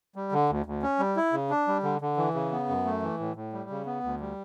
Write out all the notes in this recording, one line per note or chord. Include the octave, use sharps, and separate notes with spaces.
G3
D3
D2
D2
C#4
G3
E4
C#3
D4
G3
D3
D3
E3
C#3
B3
F#2
A3
E3
A2
A2
G3
C#3
B3
D2
G3